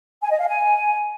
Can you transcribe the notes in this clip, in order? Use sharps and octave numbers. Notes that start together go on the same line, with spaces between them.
G#5
D#5
F5
G#5